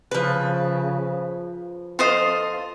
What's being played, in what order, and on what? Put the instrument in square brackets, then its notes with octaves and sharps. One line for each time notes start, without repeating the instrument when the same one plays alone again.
[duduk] C#3 [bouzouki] F3 B4
[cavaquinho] F4 C5 D#5 [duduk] A4